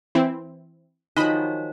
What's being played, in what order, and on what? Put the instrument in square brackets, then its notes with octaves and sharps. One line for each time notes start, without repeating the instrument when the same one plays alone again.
[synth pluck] E3 C4 E4
[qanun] D#3 F3 F#3 [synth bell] D#4 [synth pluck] D#5 B5